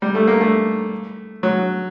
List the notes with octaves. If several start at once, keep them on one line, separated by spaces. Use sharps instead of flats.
G3
A3
A#3
A3
F#3